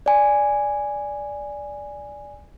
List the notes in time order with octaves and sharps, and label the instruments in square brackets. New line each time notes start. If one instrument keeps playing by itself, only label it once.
[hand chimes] D5 G#5